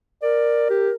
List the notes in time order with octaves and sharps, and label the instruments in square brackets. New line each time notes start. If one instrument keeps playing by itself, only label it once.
[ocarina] A#4 [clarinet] D5
[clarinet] G4